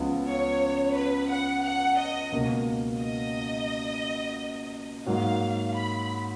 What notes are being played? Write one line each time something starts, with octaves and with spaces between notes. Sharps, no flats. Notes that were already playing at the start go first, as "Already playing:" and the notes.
Already playing: C#2 C#3 F3 B3
C#5
B4
F#5
F#5
D#5
C#2 B2 A#3
D#5
G#2 F#3 A#3 F5
B5